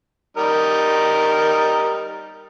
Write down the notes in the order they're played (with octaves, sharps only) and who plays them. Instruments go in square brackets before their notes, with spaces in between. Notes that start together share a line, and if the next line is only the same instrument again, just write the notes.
[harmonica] G3 D#4 A#4